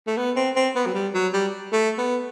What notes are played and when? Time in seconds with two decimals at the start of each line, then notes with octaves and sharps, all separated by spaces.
0.07 A3
0.17 B3
0.36 C4
0.56 C4
0.75 B3
0.86 F#3
0.94 G3
1.14 F#3
1.33 G3
1.72 A3
1.98 B3